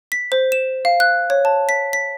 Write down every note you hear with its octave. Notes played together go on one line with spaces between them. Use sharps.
B6
C5
E7
F5
F#6
C#5
A5
B6
B6